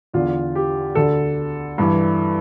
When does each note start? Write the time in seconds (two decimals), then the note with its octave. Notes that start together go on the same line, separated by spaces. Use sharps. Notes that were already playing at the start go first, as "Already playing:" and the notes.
0.14 E2 D3 F4
0.55 G4
0.95 D2 D3 A4
1.78 G2 E3